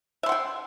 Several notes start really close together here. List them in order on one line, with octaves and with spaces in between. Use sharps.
E5 C6 F#5 G5